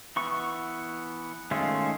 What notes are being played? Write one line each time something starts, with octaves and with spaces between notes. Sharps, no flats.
E3 B3 C#6
D#3 G#3 A3 C#4 F4